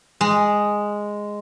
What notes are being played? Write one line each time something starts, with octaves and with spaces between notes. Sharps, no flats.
G#3